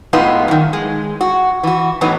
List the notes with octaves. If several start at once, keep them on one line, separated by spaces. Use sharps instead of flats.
A2 G#3 B3 D#4 F4
F#2 D#3
G#3
F#4
E3 F#4
A2 E3 F#3 B3 D#4